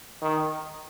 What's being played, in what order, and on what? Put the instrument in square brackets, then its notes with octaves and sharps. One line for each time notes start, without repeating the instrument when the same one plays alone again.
[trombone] D#3